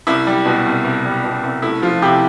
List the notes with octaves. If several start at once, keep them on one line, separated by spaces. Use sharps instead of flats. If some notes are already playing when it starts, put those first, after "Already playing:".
C2 E4
G3
B2
C2
C2
G3
B2
C2
A3 E4
F3 F4
C3 E4 G4